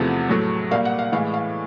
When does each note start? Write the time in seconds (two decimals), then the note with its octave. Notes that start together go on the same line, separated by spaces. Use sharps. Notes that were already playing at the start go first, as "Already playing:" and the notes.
Already playing: E2 C3 F3 A3 F#5
0.29 A2 F#3 A3
0.71 A#2 G3 A#3 F5
0.85 F#5
0.99 F5
1.12 A2 E3 G#3 F5
1.34 F5